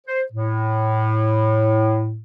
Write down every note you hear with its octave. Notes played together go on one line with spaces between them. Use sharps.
C5
A2